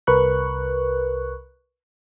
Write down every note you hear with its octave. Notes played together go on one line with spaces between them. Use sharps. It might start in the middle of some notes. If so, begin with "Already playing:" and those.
C2 A#4 B4 C#6 F#6